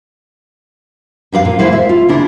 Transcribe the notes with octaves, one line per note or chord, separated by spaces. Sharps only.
F2 D4 A#4 F5
A#2
D2 E3 G#3 E4 C5 F5
E5
F4
C#3 D4 E4